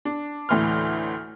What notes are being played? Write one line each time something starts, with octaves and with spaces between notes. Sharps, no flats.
D4
D2 A2 E3 C6 F6